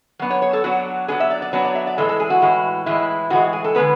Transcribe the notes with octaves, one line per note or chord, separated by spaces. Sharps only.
F#3 B3 D4
C#5
C#5
A4
F#3 B3 D4 F#4
F#3 B3 D4 G#4
E5
D5
D5
F#3 B3 D4 C#5
D5
E5
D5
A2 E3 G#3 A4
A4
G#4
F#4
A2 E3 G#3
A2 E3 G#3 E4
A2 E3 G#3 F#4
G#4
A4
D3 G#3 B3 B4